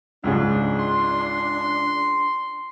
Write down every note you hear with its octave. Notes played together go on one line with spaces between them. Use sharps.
C#2 G#2 C#3 D4
C6